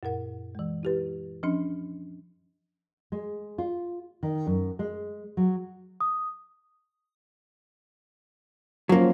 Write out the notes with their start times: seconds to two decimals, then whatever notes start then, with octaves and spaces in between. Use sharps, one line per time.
0.03 F#2 A#2 A#4 F#5
0.55 E3 G#3
0.83 E4 G4 B4
1.43 F3 C#4 D4
3.12 G#3
3.58 F4
4.23 D#3
4.47 F#2
4.79 G#3
5.37 F#3
6.01 D#6
8.89 F3 F#3 A#3 C#4 C5